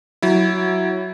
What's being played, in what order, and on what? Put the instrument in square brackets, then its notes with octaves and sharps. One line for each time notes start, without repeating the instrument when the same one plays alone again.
[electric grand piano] F#3 E4